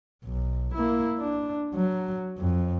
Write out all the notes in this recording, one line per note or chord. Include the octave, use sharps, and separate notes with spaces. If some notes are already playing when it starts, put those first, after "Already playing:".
B1
A#3 E4
D4
F#3
F2